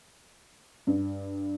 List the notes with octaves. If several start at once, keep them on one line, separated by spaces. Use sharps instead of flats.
G2